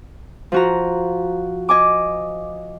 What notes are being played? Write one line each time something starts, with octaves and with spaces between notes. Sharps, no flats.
F3 F#4 A#5
D#5 G#5 D6